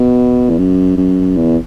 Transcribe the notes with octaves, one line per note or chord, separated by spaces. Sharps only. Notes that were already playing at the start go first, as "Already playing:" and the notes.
Already playing: B2
E2
F#2
F#2
E2